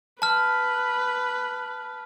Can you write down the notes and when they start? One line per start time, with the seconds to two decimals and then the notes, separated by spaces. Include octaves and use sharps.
0.22 B4 A5 F6